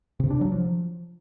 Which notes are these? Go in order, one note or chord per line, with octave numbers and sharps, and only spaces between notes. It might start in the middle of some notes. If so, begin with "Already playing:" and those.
C3
D4
F#3
F3